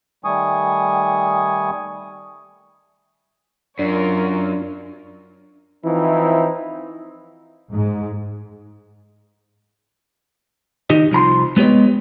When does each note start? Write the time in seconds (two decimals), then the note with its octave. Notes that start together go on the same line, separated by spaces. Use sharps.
0.25 D#3 G3 A3 G#5 C#6 D#6
3.79 F#2 D4 F4 A#4 C#5
5.86 E3 F3 C4 D#4 E4
7.72 G#2
10.90 D#3 D#4 G4 D#5
11.11 C2 F3 A#5 C6
11.57 G#3 B3 G4 C#5 D#5